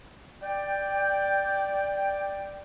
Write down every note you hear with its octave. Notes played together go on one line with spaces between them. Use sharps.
D5 G5